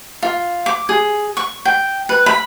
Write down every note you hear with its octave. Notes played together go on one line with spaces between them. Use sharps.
F4
D6
G#4
C#6
G5
B4
B5